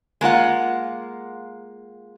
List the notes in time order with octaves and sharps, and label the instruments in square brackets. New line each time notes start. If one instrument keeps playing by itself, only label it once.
[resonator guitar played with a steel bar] G#3 A#3 F4 F#5